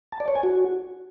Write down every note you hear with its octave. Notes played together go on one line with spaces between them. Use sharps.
A5
D5
C#5
G#5
F#4